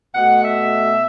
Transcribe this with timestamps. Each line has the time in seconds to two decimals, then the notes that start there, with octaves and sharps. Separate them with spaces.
0.15 B2 A3 F#5
0.43 E5